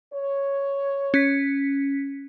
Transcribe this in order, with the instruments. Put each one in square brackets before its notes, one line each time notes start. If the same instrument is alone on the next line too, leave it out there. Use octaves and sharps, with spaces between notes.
[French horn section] C#5
[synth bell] C#4 B6